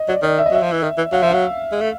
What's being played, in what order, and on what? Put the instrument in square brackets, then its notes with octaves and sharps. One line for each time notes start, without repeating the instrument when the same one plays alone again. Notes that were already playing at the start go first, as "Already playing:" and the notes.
Already playing: [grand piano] D#5
[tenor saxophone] F#3 [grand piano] D5
[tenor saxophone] D#3 [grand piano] D5
[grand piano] E5
D#5
[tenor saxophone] F#3 [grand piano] E5
[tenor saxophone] F3
E3
D#3
E3
[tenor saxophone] F#3 [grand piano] F5
[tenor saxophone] F3 [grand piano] E5
[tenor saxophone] F#3 [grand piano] F5
[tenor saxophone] G#3
A3